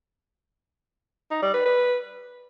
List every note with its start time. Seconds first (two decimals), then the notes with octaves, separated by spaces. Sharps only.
1.31 D#4
1.42 G3
1.54 B4
1.65 B4